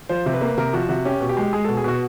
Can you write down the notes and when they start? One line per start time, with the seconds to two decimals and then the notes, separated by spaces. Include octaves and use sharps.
0.09 F3 C5
0.26 C3
0.34 B4
0.41 A#3
0.57 C3 A#4
0.73 F3 F#4
0.89 C3 F#4
1.05 C#4 G4
1.21 B2
1.29 G4
1.37 G#3
1.53 G#3 G#4
1.64 B2 A4
1.77 G#4
1.84 B2 F#4